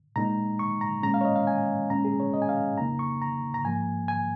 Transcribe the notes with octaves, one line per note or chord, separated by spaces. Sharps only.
A#2 G#3 D#4 A#5
C#6
A#5
A#2 G#3 C#4 A#5
F5
C#5
D#5
F5
G#5
A#2 G#3 C#4 A#5
G#4
C#5
D#5
G#5
F5
F2 C#3 A#3 D#4 A#5
C#6
A#5
A#5
G#2 F3 A#3 G#5
G#5